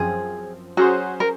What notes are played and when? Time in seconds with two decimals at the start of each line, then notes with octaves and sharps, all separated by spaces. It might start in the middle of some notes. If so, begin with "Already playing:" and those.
Already playing: F#2 F3 C4 G#4
0.77 F#3 C#4 F#4 G#4 C5
1.20 A#4